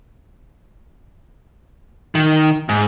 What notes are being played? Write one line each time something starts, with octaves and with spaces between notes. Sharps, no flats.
D#3
G#2